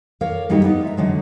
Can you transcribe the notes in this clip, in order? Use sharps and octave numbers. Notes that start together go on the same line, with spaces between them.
A#4 C#5 D5 F5
G2 F#3 G3 A#3 D#4 G4
B3 D#4
G#3 E5 A#5
D3 F#3 G#3